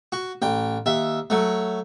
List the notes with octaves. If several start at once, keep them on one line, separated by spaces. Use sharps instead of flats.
F#4
A1 G5
D#2 E5
F#3 A3